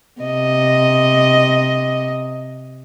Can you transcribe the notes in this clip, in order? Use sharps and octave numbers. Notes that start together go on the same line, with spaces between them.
C3 D#5